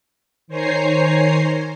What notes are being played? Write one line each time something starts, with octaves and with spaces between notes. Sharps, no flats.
D#3 C5 C#5 G#5 A#5 C7